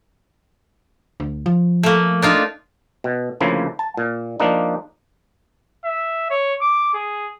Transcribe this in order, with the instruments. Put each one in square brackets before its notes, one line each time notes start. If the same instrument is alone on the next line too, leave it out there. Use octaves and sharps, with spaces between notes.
[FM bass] D2
F3
[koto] A3 A#3
D4 D#4 F4
[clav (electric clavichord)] B2
D2 C#3 F3 A#3 E4
A5
A#2
F3 A#3 D4 D#4
[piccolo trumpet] E5
C#5
D6
G#4